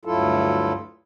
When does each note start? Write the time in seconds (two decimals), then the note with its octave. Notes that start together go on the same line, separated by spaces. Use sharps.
0.05 D2 G2 F#3 E4 F4 A4